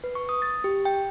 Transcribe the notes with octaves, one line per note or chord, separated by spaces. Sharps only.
B4
C#6
D#6
A6
G4
G5